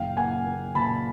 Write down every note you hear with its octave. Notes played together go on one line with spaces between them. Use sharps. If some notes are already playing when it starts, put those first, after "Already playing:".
Already playing: F#1 A#2 F5 G5
A#3 F#5 G#5
A#3
A#2 A5 B5